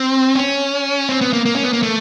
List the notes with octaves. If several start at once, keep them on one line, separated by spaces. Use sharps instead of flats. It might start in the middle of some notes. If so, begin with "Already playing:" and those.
Already playing: C4
C#4
C4
B3
A#3
A#3
C#4
B3
A#3
A3